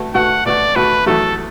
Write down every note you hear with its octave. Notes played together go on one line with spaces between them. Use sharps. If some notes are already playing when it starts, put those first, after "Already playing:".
Already playing: B2 A3 F#4
B2 A3 F#4 F#5
B2 A3 F#4 D5
B2 A3 F#4 B4
E2 B2 F#3 A3 A4